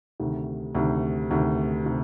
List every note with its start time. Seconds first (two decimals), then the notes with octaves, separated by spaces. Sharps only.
0.20 D2 C3 D#3
0.75 D2 C3 D#3
1.31 D2 C3 D#3
1.86 C3 D#3